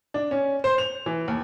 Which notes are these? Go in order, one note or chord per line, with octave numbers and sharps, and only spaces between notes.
D4
C#4
C5
F7
E3
D#2